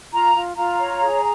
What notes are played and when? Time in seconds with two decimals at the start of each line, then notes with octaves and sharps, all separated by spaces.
0.12 F4 A#5
0.34 F4
0.56 F4 A#5
0.79 C#5
1.01 G#4